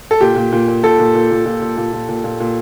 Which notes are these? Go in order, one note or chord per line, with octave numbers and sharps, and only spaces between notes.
A4
A#2 G4
A#2
A#2
A#2
A#2 A4
A#2
A#2
A#2
A#2
A#2
A#2
A#2
A#2
A#2
A#2